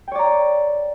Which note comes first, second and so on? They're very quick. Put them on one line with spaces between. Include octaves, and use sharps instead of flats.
G5 C#5 D5 A#5